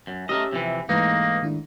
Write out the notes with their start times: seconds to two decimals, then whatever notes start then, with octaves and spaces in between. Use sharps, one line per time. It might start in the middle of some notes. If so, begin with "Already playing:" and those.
0.07 F#2
0.29 A3 C#4 G4 A#4 D#5 E6
0.53 C3 E3 F3
0.89 G#2 E3 A3 A#3 D#4 B4 A#6
1.43 D#3 D4 E4